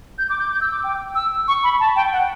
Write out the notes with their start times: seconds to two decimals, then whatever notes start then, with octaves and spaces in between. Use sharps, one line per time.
0.18 G6
0.30 D6
0.39 G6
0.51 G6
0.61 E6
0.72 D6
0.84 G5
1.15 E6
1.48 C#6
1.64 B5
1.80 A5
1.96 G5
2.13 F#5